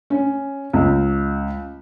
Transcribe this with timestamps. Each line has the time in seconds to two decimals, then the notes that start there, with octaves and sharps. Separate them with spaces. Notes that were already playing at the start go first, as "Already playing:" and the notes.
0.10 C#4
0.73 C#2